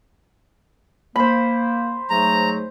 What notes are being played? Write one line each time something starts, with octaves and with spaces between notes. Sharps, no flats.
A#3 C5 B5
G#2 F#3 A3 A#5